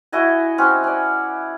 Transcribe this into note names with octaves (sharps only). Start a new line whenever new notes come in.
E4 F#4 D#5 G#5
C4 C#4 F#4
C#4 D5